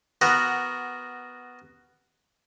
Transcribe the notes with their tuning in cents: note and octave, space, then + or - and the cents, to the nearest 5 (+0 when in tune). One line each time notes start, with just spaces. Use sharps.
B3 +5 F#4 +0 A#4 -5